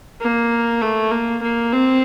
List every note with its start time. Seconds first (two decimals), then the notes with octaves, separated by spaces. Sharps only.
0.21 A#3
0.81 A3
1.11 A#3
1.43 A#3
1.72 C4